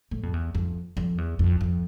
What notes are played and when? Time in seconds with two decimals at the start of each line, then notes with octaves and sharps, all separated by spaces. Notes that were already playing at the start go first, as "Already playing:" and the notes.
0.11 A2
0.23 F2
0.33 E2
0.55 F2
0.97 F2
1.18 E2
1.39 F2
1.61 F2